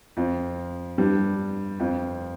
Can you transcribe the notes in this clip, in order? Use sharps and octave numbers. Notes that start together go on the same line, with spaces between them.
F2 F3
G2 G3
F2 F3